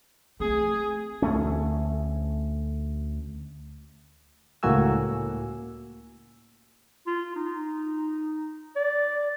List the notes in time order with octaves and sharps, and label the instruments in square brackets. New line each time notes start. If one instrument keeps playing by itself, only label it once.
[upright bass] A3 C4 [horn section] G#4
[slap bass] D2 A3 C#4
[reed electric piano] C#2 A2 A#3 F#4 G#5 E6
[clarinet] F4
D#4
D5